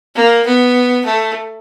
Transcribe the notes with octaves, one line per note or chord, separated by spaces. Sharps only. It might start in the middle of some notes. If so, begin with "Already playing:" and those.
A#3
B3
A3